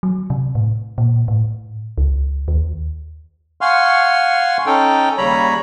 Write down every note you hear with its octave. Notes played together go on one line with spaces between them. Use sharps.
F#3
C3
A2
A#2
A2
C#2
D#2
F5 F#5 G#5 C6 C#6 F6
C#4 D#4 A4 G5
D#2 C#3 G3 C#5 A#5 B5